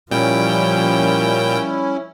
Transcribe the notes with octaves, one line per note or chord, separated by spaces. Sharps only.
A#2 F3 G3 A#3 C#4 E4 G5